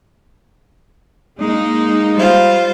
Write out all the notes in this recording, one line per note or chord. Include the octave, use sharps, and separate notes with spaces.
G#3 A#3 D#4
G3 F4 C5